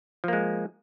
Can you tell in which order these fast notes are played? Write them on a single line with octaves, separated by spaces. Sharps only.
F3 A#3 G#3